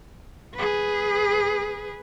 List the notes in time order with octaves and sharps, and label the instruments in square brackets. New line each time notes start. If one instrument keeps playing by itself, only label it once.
[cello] G#4 B4